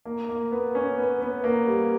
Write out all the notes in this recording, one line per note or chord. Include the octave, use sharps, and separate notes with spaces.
A#3
A#3
B3
C#4
B3
B3
A#3
G3